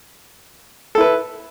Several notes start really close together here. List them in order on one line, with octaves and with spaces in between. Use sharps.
A4 E4 B4